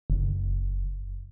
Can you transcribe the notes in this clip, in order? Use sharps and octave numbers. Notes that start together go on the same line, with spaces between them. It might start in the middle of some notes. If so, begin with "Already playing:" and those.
F#1